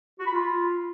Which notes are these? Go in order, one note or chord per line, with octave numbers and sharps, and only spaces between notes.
F#4
B5
F4